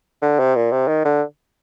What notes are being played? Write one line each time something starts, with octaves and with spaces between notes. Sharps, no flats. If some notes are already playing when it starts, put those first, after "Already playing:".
D3
C3
A#2
C3
D#3
D3